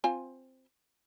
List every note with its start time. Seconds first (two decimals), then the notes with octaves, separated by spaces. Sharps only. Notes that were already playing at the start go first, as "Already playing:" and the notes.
0.04 C4 F4 G#5